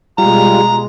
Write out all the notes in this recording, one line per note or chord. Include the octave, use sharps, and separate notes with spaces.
B2 G3 G#3 F4 A#5